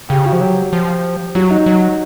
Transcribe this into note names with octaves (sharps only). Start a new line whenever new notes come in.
C#3 G4
F#4
F3
F#3 G4
F3
F#3 F#4
D#4
F#3